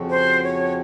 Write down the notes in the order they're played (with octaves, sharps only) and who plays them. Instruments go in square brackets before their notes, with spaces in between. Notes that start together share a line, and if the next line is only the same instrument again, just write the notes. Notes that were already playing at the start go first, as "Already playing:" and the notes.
Already playing: [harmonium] F2 C#3 F3 C4 F#4
[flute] C5
C#5